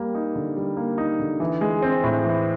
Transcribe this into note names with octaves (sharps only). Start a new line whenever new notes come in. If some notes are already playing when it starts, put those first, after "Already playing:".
Already playing: G3 A#3
D#4
D3
G3
A#3
D#4
D3
E3
G#3
C4
A2
E3